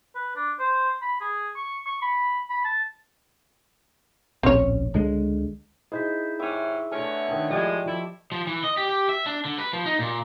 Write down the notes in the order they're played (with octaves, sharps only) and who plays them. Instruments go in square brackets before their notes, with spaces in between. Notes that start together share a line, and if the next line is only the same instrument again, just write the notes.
[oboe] B4
D4
C5
B5
G#4
C#6
C#6
B5
B5
A5
[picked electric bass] D1 A#1 C#4 [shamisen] C4 C#5
[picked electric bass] C#2 D3 G#3
[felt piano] D#4 E4 G#4 [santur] C5 [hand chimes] D#5 G6 B6
[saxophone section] D#2 G#2 C#4 [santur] E5 D6 [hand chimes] G5 C#6
[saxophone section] D3 B3 C#5 [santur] A3 [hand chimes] G#5 F6
[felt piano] D#3 D4 [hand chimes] F#5 G5 D#6
[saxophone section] A2 G#3 [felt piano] F3 [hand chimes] F4 D5 [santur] G4 D#5
[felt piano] F3 [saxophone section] E4 A4
[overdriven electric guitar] F3
E3
D#5
G4
G4
E5
D4
D3
B4
F3
D#4
A#2